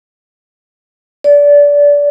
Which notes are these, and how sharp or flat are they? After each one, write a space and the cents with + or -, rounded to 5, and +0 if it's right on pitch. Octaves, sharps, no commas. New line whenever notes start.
D5 -25